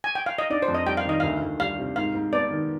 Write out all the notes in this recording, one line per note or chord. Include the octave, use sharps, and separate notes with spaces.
G#5
G5
F5
D#5
D4 D5
C5
F2
D#5
G3 G5
F5
D#3 D#5
D2 F5
D2
G3 F5
C3
G#2 F5
G#2
B3 D5
D#3